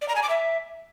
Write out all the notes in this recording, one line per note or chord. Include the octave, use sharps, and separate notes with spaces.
D5
A#5
G#5
D6
E5